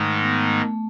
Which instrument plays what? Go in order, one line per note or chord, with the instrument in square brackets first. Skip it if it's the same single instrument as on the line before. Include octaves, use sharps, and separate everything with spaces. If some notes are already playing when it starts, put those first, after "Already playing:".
Already playing: [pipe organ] G#2 D#3 G#3 D#4 [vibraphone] A3
[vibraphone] B3
A3
A3